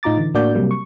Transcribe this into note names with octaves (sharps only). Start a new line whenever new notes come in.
A2 D#4 F4 A#5 D6 A6
D3 E3
A2 A#3 D4 F#4 D5 G6
C3 F#3 G3 A#3
C#6